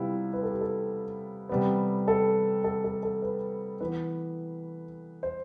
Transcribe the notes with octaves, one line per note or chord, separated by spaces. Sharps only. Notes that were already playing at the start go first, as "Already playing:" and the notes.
Already playing: C3 G3 B3 E4 F4 B4
B4
A4
G4
A4
C3 G3 B3
A4
A4
A4
A4
B4
E3 B3 B4
C5